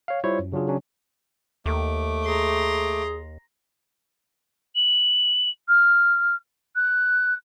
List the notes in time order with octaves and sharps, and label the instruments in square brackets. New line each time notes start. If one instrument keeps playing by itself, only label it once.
[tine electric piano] C#5 F5
G3 E4 F4 C5 C#5
F#2
C#3 F#3 D4 F4 G#4
C#3 F#3 C#4 D4
[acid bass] D#2 [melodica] A3 D6
[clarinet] G#4 [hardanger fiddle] A#5 C6
[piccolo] F#7
F6
F#6